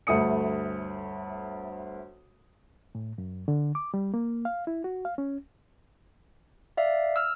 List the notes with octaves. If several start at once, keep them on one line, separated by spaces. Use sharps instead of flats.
G1 D2 A3 D#6 C#7
A2
F#2
D3
D6
G3
A#3
F5
E4
F#4
F5
C#4
D5 E5 F5
E6 F6